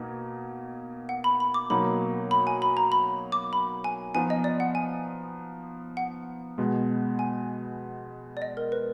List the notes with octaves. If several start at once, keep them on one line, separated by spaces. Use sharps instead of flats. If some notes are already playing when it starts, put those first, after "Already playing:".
Already playing: B2 A#3 D#4
F#5
B5
B5
D6
B2 F#3 A#3 D#4 B5
B5
G#5
B5
A#5
B5
D6
B5
G#5
F3 B3 D#4 G#5
D#5
D5
F#5
G#5
F#5
B2 G#3 B3
G#5
D5
D#5
A#4
B4